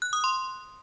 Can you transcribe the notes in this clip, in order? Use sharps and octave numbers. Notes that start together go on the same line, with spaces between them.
F#6
D#6
C6